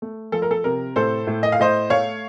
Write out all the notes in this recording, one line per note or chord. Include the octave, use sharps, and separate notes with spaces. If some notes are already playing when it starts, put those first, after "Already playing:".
A3
F3 A4
A#4
A4
C3 A#4
A2 A4 C5
A2
D#5
F5
A2 C5 D#5
A3 C#5 F5